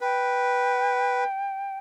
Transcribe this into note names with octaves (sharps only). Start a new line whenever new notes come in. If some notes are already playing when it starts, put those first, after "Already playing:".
B4 G5